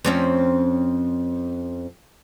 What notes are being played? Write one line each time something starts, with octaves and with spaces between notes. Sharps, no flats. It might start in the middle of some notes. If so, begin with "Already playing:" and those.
F2 C4 C#4